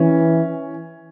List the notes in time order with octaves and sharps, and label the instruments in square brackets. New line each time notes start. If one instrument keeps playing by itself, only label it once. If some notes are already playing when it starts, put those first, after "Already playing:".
Already playing: [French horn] E3 [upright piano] C#4